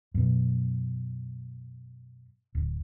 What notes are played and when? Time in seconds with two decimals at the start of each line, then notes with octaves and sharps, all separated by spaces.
0.14 F#2 B2
2.55 D1